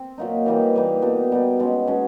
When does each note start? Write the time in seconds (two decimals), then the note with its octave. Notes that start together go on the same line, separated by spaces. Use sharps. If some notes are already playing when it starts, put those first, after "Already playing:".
Already playing: C4
0.18 A#2 F#3 A#3 D#4
0.46 E3 G3 A#3 D#4
0.74 E3 G3 A#3 D#4
1.02 B2 G3 B3 D#4
1.31 B2 G3 B3 D#4
1.59 B2 G#3 C#4
1.87 B2 G#3 C#4